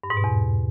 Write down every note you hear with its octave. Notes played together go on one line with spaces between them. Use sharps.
G2
G#2
B2
E2